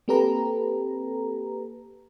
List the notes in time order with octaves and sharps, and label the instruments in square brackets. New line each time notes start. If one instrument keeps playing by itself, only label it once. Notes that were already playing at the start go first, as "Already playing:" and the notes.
[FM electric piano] A#3 C4 G4 A4 B4 A#5